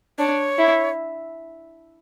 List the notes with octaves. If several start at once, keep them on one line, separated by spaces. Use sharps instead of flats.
D4 C#5
E4